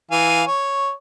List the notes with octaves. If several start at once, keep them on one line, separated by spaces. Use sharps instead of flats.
E3 F5 G#5
C#5